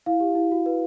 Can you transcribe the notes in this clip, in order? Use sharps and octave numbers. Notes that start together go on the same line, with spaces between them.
E4 F5
G4
E4
F#4
B4